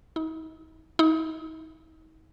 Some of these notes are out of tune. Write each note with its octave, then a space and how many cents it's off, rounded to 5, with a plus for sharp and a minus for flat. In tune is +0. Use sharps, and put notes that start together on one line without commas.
D#4 +35
D#4 +35